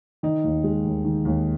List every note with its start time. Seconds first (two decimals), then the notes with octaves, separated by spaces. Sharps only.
0.23 D#3 D#4
0.44 D#2
0.64 G#3
0.85 D#2
1.05 D#3
1.25 D#2